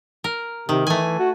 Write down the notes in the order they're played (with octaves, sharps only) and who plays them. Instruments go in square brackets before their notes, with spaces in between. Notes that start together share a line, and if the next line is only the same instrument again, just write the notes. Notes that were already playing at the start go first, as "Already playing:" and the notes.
[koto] A#4
[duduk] C3 [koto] D#3
[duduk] E3 [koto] A3 G#5
[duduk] F#4